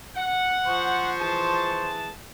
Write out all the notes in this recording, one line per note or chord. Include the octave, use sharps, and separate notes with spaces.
F#5
F3 C5 C#6
E3 G#4 A5